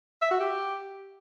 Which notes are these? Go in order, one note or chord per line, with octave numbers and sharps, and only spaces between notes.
E5
F#4
G4